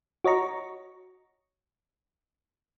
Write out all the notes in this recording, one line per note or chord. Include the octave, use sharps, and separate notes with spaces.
F#4 C#5 D#5 A#5 C#6